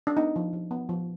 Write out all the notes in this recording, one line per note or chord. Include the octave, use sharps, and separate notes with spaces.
D4
B3 D#4
F3
F3
B3
F3